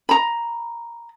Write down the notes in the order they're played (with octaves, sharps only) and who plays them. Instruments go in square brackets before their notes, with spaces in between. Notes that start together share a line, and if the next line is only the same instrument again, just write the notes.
[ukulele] A#5 B5